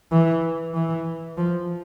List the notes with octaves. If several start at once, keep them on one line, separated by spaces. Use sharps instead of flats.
E3
E3
F3